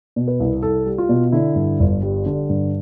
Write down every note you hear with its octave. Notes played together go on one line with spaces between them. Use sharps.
B2
B4
C2
C2 A4
G3
F4
B2
D3 E4
G2
G1
G3
D3
G2